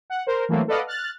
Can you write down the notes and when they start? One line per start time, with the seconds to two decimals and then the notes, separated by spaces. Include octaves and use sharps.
0.10 F#5
0.27 A#4 C5
0.49 E3 F#3 A3 A#3 C4
0.68 A4 B4 D5 D#5 F5 F#5
0.87 F6 F#6 A6